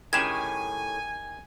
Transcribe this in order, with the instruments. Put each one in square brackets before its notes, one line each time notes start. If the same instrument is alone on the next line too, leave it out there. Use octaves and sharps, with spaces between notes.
[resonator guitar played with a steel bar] A2 C#4 [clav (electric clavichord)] D#3 G4 G#4 [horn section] G#5 [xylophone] G#6 E7